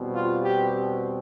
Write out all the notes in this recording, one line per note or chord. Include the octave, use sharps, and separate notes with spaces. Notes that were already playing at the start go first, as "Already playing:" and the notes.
Already playing: E2 B2 G3 C4
F4
G4